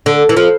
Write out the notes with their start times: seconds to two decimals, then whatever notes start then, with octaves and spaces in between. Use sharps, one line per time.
0.06 D3
0.29 E3
0.37 F3